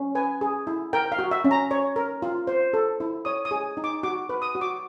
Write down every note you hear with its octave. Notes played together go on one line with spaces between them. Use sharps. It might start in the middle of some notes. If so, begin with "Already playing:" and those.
Already playing: C#4
B4 G#5
G#4
E4
A#4 G5
F5
F#4
E5
C#4
A#5
C#5
A#4
F4
C5
A4
E4
C#5 D#6
D#6
G#4
D#4
D6
F#4 D6
B4
D#6
F#4
D6